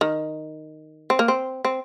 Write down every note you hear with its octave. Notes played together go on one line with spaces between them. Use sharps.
D#3
C4
A#3
C4
C4